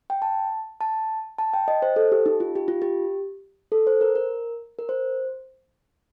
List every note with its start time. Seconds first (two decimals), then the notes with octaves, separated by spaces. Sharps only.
0.10 G5
0.22 A5
0.81 A5
1.39 A5
1.53 G5
1.68 D#5
1.82 C5
1.96 A4
2.12 G4
2.26 D#4
2.40 F4
2.55 G4
2.68 F4
2.82 G4
3.72 A4
3.87 C5
4.01 A#4
4.15 A#4
4.79 A#4
4.89 C5